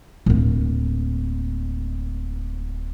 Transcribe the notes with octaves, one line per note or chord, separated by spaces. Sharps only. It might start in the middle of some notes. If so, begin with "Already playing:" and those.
D1 A#3